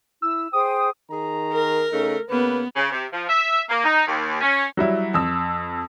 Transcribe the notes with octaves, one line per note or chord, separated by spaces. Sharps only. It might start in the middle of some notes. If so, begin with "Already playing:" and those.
E4 E6
G#4 C5 G5 D#6
D#3 G#4 A#5
A#4
C#3 A3 D#4
C#3 A#3 B3 B4
C#3
C3
F3
E5
A#3
D#4
D#2
C#4
F#3 G3 E4
F2 E6